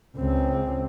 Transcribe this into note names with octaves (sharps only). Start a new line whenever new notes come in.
C#2 C4